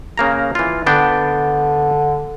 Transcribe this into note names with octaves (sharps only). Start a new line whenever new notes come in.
C#3 A#3 A#5
E3 F4
D3 B3 D4 G5